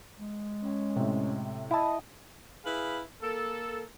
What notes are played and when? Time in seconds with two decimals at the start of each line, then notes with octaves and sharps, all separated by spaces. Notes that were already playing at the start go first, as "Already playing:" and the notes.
0.18 G#3
0.62 C#4
0.96 A2 C3
1.71 E4 D#5 A5
2.65 E4 G#4 B4 F5 B5
3.22 A#3 A4